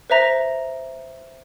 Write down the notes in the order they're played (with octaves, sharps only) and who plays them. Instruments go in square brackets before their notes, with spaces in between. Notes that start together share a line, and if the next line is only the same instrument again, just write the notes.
[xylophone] B4 C5 E5 A#5 A#6